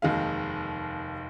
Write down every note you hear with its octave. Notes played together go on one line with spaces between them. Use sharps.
F1 D#2 D#3 G#3 F5